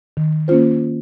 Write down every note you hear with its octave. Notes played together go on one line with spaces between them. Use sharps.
D#3
A#3 C#4 F4 C5